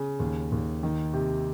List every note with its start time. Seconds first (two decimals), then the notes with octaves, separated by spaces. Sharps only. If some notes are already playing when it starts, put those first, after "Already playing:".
Already playing: C#3
0.19 D#2
0.52 D#2
0.83 D#3
1.13 C3